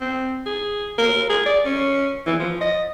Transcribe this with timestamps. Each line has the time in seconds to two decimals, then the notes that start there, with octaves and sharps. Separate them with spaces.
0.01 C4
0.46 G#4
0.98 A#4
1.29 G#4
1.46 D5
1.65 C#4
2.26 E3
2.40 F3
2.61 D#5